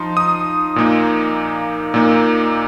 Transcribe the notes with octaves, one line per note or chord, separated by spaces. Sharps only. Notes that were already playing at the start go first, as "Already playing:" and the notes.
Already playing: F3 D#4 C6
D#6
A#2 A#3 D#4
A#2 A#3 D#4